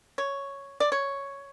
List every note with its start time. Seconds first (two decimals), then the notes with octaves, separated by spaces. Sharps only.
0.18 C#5
0.80 D5
0.92 C#5